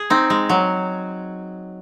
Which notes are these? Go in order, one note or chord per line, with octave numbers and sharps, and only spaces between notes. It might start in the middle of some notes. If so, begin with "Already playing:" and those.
Already playing: G#4
C4 D#4
G#3
F#3